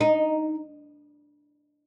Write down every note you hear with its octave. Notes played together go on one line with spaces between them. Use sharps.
D#4